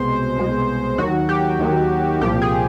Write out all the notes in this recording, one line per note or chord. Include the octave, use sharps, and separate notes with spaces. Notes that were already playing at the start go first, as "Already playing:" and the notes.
Already playing: C2 B2 G#3 C5
C2 B2 G#3
D#2 D#3 F#3 F#4
G4
D#2 D#3 F#3
C2 A#2 F3 G4
G#4